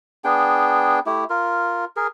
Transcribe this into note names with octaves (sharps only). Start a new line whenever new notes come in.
B3 D4 G#4 G5
A3 E4 G4
F4 A#4
G#4 A#4